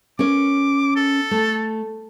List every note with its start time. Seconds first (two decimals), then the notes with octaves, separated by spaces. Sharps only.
0.19 C#4 A#4 C#5 D6
0.96 A4
1.31 A3